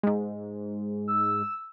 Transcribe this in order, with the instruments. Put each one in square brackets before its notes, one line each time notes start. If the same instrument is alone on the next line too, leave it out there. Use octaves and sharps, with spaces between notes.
[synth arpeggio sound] G#2 G#3
[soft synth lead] E6